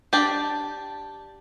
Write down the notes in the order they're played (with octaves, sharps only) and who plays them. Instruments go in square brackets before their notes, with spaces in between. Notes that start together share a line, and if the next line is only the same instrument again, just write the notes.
[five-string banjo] D4 G4 D5